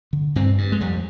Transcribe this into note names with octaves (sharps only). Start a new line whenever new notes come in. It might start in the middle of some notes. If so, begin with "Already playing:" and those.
D3
G2 C4
G2
G#3
F2 G3